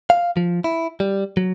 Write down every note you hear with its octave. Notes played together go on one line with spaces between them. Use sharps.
F5
F3
E4
G3
F#3